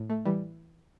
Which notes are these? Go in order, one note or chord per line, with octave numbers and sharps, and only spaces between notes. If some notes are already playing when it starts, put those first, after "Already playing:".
Already playing: A2
A3
E3 G3